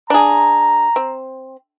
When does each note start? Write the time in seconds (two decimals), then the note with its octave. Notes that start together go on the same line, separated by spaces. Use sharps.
0.10 D4 G#4 A#5
0.96 C4